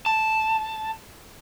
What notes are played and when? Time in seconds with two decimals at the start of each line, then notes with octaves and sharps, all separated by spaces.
0.06 A5